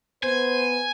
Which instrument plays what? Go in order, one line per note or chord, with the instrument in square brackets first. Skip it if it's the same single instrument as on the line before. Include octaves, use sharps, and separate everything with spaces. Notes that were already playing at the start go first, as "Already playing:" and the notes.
[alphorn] B3 [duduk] C5 [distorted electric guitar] G#5